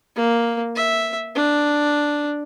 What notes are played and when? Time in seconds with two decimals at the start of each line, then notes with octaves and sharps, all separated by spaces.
0.16 A#3
0.76 E5
1.35 D4